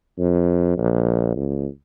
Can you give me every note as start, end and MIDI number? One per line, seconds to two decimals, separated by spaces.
0.19 0.73 41
0.77 1.33 34
1.36 1.67 37